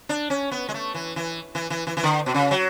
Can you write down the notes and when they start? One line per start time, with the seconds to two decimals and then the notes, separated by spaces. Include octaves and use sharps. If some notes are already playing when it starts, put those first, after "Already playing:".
0.09 D4
0.30 C#4
0.51 B3
0.69 G#3
0.74 A3
0.94 E3
1.16 E3
1.55 E3
1.70 E3
1.87 E3
1.97 E3
2.03 D3
2.26 B2
2.34 C#3
2.51 F#3